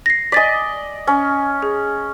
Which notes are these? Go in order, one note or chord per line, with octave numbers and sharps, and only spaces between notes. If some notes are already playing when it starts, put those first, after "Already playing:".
A#6 C7
D5 D#5 G#5 A6 B6
C#4
G#4